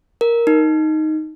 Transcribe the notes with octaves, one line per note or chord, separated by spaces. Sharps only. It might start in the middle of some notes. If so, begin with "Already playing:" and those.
A#4
D#4